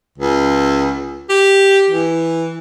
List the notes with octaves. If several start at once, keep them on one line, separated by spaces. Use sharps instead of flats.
C#2
G4
E3